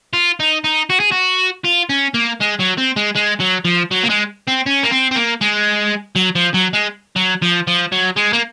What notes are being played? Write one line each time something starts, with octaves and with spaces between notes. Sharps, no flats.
F4
D#4
D#4
F#4
G#4
F#4
F4
C#4
A#3
G#3
F#3
C4
G#3
G#3
F#3
F3
F#3
A#3
G#3
C4
C#4
A#3
C4
C4
A#3
G#3
F#3
F3
F#3
G#3
F#3
F3
F3
F#3
G#3
A#3